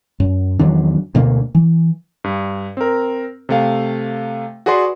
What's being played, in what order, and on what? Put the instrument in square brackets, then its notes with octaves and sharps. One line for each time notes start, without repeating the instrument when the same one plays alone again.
[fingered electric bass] F#2
E2 D#3 F#3 D4
D2 B2 A#3 D4
E3
[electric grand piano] G2
C4 A#4
C3 A3 F5
F#4 G#4 B4 D5 C6